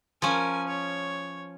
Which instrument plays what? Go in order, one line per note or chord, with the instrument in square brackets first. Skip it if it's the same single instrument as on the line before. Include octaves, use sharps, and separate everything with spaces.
[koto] F3 C#4 [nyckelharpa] A#4 G#5
[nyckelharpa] C#5